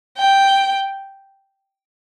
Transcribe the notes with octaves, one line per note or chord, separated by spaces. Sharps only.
G5